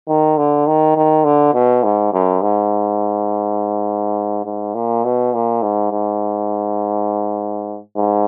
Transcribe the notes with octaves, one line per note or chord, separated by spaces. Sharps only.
D#3
D3
D#3
D#3
D3
B2
G#2
F#2
G#2
G#2
A#2
B2
A#2
G#2
G#2
G#2